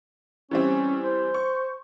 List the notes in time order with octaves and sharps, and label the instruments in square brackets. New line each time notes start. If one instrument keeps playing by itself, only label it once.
[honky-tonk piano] E3 G3 C4 [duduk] C#4
[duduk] C5
[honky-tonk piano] C#6